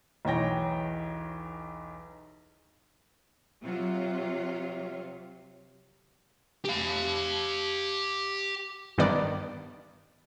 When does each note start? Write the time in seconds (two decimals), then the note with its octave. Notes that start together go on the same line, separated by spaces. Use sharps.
0.25 B1 E2 C#5 G5 A#6
3.62 C3 F#3 F4
6.65 G4 F5
8.98 G2 D#3 B3 D5